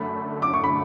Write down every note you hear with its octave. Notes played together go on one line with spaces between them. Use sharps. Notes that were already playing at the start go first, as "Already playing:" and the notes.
Already playing: F#2 D3 A3 B5
D6
C#6
B5